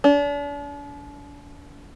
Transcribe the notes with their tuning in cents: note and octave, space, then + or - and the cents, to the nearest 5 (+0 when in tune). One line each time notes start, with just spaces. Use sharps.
D4 -40